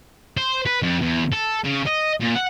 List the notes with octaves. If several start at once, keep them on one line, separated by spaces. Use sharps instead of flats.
C5
B4
F2
E2
A4
C#3
D#5
A#2
F#5